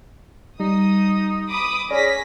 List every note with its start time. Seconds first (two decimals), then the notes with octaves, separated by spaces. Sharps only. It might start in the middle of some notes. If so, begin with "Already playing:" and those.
0.60 G3 D#4 D#6
1.49 B5 D6 D#6
1.91 C#4 G#4 C#5 D5 A#6 B6